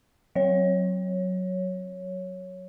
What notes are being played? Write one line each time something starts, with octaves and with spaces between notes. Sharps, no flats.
F#3 C#5